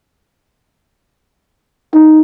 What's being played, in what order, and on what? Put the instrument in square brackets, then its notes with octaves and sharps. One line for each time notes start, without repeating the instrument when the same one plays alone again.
[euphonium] D#4